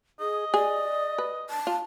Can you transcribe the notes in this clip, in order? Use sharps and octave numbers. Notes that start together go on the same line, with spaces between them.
G#4 D#5
G#4 D5
B4
A5
F4